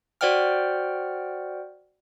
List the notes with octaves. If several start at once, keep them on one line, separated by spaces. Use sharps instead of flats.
F#4 C5 D5 F#5 G5 F6